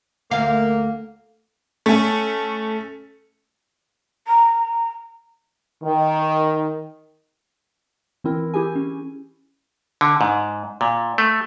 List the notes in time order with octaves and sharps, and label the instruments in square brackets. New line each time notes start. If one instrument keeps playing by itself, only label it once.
[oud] D2 F5 [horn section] A#3
[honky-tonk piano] A3 C#4
[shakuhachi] A#5
[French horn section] D#3
[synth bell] E3 C4 E4 A#4
E4 G4 G#4 G#5
C#4
[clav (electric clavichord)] D3
G#2
A#2
A3